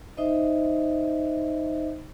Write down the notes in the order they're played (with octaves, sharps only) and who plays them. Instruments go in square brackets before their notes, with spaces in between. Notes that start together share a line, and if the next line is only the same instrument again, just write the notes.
[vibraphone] D#4 C5 D#5 E5